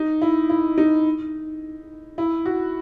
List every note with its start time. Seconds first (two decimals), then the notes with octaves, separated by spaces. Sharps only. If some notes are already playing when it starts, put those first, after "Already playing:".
Already playing: D#4
0.22 E4
0.50 E4
0.78 D#4
2.18 E4
2.46 F#4